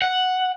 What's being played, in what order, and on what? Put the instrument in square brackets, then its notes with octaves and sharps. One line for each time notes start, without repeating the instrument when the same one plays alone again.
[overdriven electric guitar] F#5